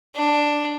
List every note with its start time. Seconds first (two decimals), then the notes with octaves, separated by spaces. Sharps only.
0.16 D4